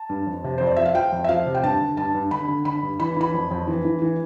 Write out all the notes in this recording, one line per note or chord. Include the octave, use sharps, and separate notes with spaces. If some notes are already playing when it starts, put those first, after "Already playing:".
Already playing: A5
G2
F2
C3
F2 C5
D5
F3 E5
F5
F3 G5
F2
E5
F3 F5
C3
G5
G2 A5
D3
G2 A5
G2
D3 B5
D3
D3 B5
G2
E3 B5
E3 B5
F2
F2
E3
E3
E3